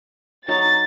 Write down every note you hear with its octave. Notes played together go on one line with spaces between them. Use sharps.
F#3 D#4 A5 A6